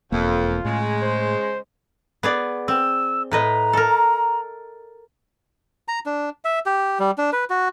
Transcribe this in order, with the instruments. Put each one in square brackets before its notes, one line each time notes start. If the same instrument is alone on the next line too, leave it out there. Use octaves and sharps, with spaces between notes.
[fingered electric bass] E1 A#3 [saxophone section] F2 [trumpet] F4
[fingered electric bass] A2 [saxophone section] C#3 G#3
[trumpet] C5
[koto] B3 G#4 D5
[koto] C4 [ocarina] E6
[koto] A2 B4 D#5 [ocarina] A#5
[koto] A4 A#4
[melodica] A#5
D4
E5
G4
G3
D4
B4
F#4